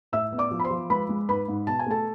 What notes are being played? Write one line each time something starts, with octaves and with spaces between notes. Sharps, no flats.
A2 E5 E6
B3
D5 D6
F3
B5
C5 C6
F3
G#3 B4 B5
G#3
G#2 B4 B5
G#2
B2 A5
G#5
A3 A4 A5